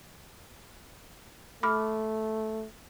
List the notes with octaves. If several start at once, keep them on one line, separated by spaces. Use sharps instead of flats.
A3 B5 D6 F6